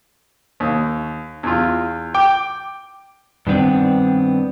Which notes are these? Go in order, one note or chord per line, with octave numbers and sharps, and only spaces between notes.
D#2
E2 F4
G5 D6
G2 D#3 B3 C4 D4